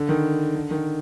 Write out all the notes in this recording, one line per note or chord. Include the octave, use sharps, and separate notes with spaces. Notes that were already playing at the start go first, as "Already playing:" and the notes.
Already playing: D3
D#3
D3
D#3